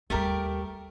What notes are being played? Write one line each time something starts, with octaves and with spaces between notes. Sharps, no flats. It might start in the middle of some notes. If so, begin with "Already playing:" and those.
D#2 G3 A3 G4 A#4